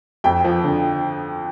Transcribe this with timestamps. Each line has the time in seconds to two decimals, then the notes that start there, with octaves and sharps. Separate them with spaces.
0.24 F2 G5
0.44 F3
0.64 D3